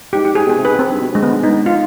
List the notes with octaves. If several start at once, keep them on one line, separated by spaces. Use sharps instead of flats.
G#2 G4
G4
G#2 G#4
B2 G#4
C3
G#2 B4
C4
G2
B2
D3
G#3
D3 B3
G2
D#4
G#2
F4